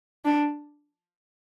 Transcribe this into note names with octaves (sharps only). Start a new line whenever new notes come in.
D4